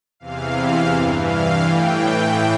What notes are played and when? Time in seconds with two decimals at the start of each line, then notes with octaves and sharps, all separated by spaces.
0.20 E2 C3 E3 F5
0.55 F5
0.91 G2 E3
1.26 F5
1.62 A2 E3 G5